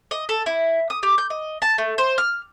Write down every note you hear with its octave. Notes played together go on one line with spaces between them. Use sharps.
D#5
A4
E4
D#6
G4
G6
D#5
A5
A3
C5
F6